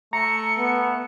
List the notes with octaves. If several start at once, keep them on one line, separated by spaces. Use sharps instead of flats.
A3 A#5 C#7
B3